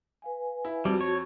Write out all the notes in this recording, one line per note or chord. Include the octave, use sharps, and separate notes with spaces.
B4 F5 G#5
E4
F2 G3 F#4 A5
C#5